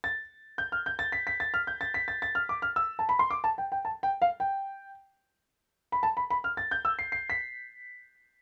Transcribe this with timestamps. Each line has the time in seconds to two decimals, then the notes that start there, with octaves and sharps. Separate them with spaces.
0.04 A6
0.58 G6
0.72 F6
0.86 G6
0.99 A6
1.12 B6
1.27 B6
1.40 A6
1.54 F6
1.67 G6
1.81 A6
1.94 B6
2.08 A6
2.22 A6
2.35 F6
2.49 D6
2.62 F6
2.76 E6
2.99 A5
3.09 B5
3.19 C6
3.30 D6
3.44 A5
3.58 G5
3.72 G5
3.85 A5
4.03 G5
4.22 F5
4.40 G5
5.92 B5
6.03 A5
6.17 B5
6.30 B5
6.44 F6
6.57 A6
6.71 G6
6.85 E6
6.99 C7
7.12 C7
7.30 B6